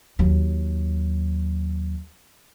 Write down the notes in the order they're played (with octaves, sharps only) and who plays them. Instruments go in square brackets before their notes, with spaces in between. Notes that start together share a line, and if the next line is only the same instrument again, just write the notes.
[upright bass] D#2 F#3